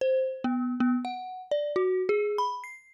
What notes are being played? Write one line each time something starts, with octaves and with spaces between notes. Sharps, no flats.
C5
B3
B3
F#5
D5
F#4
G#4
B5
C7